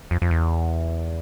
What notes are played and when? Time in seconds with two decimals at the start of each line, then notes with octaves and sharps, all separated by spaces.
0.11 F2
0.22 F2
0.31 E2